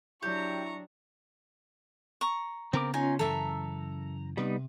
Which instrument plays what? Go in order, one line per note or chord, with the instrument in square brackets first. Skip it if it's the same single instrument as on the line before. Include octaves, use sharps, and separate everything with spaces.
[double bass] F#3 D4 [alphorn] E4 [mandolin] G4 [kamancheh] A#5 C#6
[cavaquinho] A#5 C#6
[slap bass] C#3 B3 [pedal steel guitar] C4 A#4 D6
[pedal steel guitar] C#4 F4 [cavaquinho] D#4 G#5
[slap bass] F#2 C#3 E3 [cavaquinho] A4 E5 [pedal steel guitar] A#5
[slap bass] C3 [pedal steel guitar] G3 B3 D#4